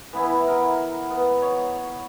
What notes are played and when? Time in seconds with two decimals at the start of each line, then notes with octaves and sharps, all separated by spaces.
0.13 E3 B3 E4
0.47 A#4
1.10 B3
1.42 C#5